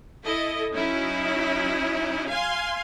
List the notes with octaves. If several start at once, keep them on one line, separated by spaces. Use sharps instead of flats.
E4 A4 D#5
F#3 C#4 D#4 E4
F5 G#5 C6